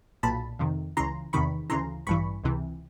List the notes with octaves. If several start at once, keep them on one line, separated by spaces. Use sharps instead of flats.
B1 A#2 A5 B5
F2 C3 D#3
C#2 C#3 E3 A#5 C6
E2 C3 D#3 B5 C#6
D2 C#3 E3 A#5 C6
A1 G2 E3 B5 C#6
C#2 C3 E3